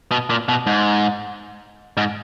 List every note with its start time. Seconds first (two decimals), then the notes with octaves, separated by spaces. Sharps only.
0.11 B2
0.30 A#2
0.49 B2
0.67 G#2
1.97 G#2